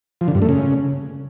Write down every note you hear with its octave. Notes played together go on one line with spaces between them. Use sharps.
F3
D3
G2
A3
C#3